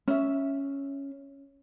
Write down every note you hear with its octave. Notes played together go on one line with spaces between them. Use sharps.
C#4 E5